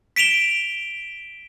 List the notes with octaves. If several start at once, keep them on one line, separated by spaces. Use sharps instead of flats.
B6 D7 E7 F7 G7